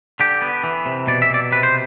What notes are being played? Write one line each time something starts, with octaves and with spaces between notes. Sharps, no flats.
D3 G4
B3
E3
C3
B2 D5
E5
B2 D5
C3 B4
C5